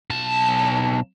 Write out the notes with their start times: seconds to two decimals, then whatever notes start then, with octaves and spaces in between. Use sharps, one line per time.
0.10 B1 A5